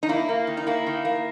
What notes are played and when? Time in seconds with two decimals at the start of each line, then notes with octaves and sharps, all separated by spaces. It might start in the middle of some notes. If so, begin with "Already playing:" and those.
0.03 D#4
0.09 A#3 E4
0.29 A#3
0.47 D#3
0.57 D#4
0.67 A#3 E4
0.86 D#3
1.05 A#3